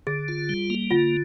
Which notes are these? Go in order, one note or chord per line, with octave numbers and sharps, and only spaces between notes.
D3 G#4
F4
G3
A#3
D3 F4